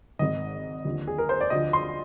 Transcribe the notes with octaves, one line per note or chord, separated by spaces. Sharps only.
G#1 G#2 D#3 D#5
D#2 D3 F3
G#4
A#4
C5
D5
D2 D3 F3 D#5
C6